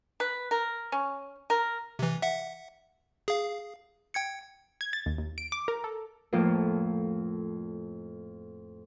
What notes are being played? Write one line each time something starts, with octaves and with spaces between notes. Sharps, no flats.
B4
A#4
C#4
A#4
C3 E3
E5 F#5
G#4 F5
G5 G#6 C#7
G#6
A6
D#2
D#2
D7
D6
A#4
A4
F2 A2 F3 A#3 F4